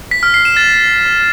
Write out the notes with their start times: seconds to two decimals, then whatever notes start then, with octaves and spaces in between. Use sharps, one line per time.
0.11 B6
0.23 F6
0.34 C7
0.45 E7
0.57 A6